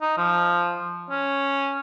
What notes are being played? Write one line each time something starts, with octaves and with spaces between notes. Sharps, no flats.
D#4
F3
C#4